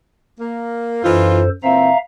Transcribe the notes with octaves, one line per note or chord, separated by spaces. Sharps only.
A#3
F#2 E3 D#4 F4 A4 C5
A#2 E3 C4 E5 F5 A#5